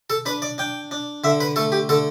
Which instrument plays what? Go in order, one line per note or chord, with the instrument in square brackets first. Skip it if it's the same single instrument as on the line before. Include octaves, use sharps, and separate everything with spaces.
[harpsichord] A4
D4 B4
D5
D4 G5
D4
D3 E5
B4
A3 A4
G4
D3 A4